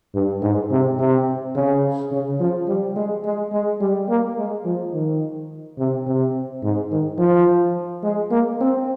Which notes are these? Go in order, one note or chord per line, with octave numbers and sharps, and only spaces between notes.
G2
G#2
C3
C3
C#3
C#3
F3
G3
G#3
G#3
G#3
G3
A#3
G#3
F3
D#3
C3
C3
G#2
D#3
F3
G#3
A#3
C4